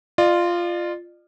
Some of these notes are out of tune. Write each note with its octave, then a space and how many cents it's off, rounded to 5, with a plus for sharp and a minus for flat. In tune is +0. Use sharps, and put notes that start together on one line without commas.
F4 -5 D5 +45